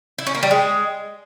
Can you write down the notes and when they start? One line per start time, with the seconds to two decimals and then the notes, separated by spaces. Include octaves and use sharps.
0.18 E4
0.27 C#4
0.35 A#3
0.43 G3
0.51 G#3